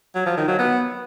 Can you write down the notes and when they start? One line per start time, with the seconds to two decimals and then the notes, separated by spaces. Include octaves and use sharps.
0.15 F#3
0.26 F3
0.37 D#3
0.48 F#3
0.59 B3